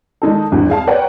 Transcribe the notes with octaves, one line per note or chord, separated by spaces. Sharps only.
D#3 G#3 D#4 A4
G#1 E2 G2 D3 E3
G#4 F5 A5
A#4 B4 C#5 D5 F#5 G5